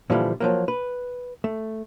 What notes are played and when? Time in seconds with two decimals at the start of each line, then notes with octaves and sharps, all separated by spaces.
0.10 A#2 D3 E3 F3 G3 A3
0.40 F3 F#3 A#3
0.68 B4
1.44 A3